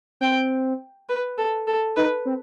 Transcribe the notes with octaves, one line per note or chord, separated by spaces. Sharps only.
C4 G5
B4
A4
A4
D#4 B4
C4